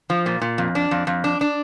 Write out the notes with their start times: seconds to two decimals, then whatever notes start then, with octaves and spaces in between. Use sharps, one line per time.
0.10 F3
0.26 A#2
0.42 A#2
0.58 F2
0.75 D4
0.91 F2
1.07 F2
1.24 D4
1.41 D4